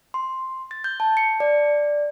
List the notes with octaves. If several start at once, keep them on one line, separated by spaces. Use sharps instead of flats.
C6
A6
G6
A5
C#7
D5